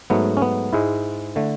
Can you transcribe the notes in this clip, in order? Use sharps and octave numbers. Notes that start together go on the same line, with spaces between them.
G#2 F#3 A3 B3
C#4
B3
G#2 G#3 E4
D3 A3